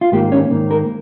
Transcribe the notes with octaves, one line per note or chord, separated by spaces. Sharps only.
F4
G#2 D#3 A#3 G4
C#4
G#2 D#3 A#3
A#4